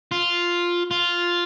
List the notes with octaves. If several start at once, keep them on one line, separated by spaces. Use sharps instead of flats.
F4
F4